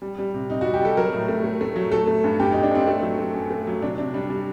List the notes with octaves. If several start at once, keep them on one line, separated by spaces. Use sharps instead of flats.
G3
G3
C3
C3 D#4
F#4
G3
G4
G3 A4
F#3 A#4
A2
A3
A3
A3
F#3
A3 A4
A3
G2
G2 G4
D#4
G2
D4
G2 C4
A3
F#3
A3
F#2
A3
F#3
C3 D4
C3 D4
G3 D4
G3